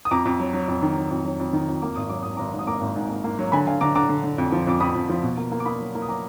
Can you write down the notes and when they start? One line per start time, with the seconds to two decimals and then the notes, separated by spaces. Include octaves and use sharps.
0.05 D#6
0.11 F2 A#5 D6
0.25 F2
0.40 F#3
0.53 F#3
0.68 F2
0.82 D#3
0.96 F#3
1.11 F2
1.25 F#3
1.40 F2
1.53 D#3
1.68 F2
1.82 A#3 D6
1.96 G#1 D#6
2.09 F#3 D6
2.23 G#1 D#6
2.37 G#1 A#5 D6
2.53 G#2
2.59 D#6
2.67 A#3 A#5 D6
2.81 G#1
2.96 G#2
3.10 A#3
3.24 A#3
3.39 F#3
3.52 D3 G#5 B5
3.67 D3 F5 G#5
3.81 D3 A#5 D6
3.95 D3 A#5 D6
4.09 D3
4.24 D3
4.38 F2
4.52 F3
4.67 F2 D6
4.80 F2 B5 D#6
4.95 F2
5.09 F3
5.23 B2
5.37 A#3
5.52 A#3
5.60 D6
5.65 A#3 B5 D#6
5.80 F#3
5.95 A#3
6.02 D#6
6.09 F#3 A#5 D6